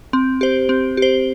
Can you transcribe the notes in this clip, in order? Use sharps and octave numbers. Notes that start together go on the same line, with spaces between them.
C4
G4 C5
C4
G4 C5